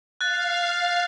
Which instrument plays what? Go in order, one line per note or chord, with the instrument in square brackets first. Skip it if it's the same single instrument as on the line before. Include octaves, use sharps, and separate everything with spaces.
[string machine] F5 [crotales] F#6 A6